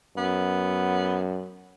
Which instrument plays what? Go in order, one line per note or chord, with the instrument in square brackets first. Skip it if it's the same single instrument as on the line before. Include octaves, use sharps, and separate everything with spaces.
[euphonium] F#2 [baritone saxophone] B3